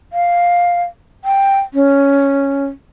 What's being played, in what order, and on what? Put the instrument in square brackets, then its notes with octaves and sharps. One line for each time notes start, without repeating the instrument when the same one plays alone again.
[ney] F5
G5
C#4